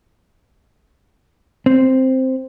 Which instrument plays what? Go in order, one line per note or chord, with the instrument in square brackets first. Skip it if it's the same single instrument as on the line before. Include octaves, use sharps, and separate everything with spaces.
[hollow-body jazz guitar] C4